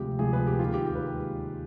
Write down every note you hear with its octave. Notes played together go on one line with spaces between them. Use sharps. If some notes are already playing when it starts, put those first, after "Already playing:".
Already playing: D2 C3 F3 G#3 G4
D2 C3 F3 G#3 G#4
B4
G4
D#2 D#3 G#3 F4
G4
G4
B4
G#3